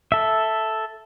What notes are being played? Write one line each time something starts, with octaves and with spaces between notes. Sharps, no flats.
A4 E5